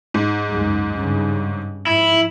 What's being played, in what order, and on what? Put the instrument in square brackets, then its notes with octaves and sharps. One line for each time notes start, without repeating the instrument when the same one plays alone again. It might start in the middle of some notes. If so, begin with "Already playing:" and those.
[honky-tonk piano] G#2
[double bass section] C#2 F#2 G#3
G2 C#3
[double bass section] G#2 F3 [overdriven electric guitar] E4